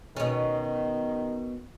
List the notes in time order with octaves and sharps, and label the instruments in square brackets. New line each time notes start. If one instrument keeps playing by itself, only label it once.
[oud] B2 C#4 [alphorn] D#3